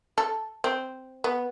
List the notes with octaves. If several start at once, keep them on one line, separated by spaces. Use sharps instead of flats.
A4
C4
B3